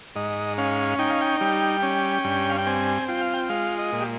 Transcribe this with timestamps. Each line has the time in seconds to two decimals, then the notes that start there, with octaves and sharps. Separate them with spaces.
0.16 G#2 D#5
0.58 C#4 F5
0.99 D#4 G5
1.10 F5
1.21 G5
1.41 G3
1.83 C#4
2.25 G2
2.50 F5
2.58 G5
2.67 C4 G#5
3.08 F4 G5
3.21 F5
3.34 G5
3.49 G#3 F5
3.78 D#5
3.92 A#2
4.01 G4